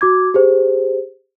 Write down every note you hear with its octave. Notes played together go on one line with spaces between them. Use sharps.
F#4 D6 G#6
G4 G#4 C5